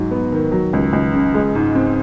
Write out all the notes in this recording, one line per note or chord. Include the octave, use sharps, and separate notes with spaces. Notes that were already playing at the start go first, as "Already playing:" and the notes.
Already playing: G#2 F#3
B3
D#3
F#3
C#2
C#2
C#3
G#3
G#2
C4